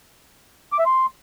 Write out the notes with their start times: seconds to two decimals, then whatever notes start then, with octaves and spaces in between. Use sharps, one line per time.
0.72 D6
0.79 E5
0.86 C6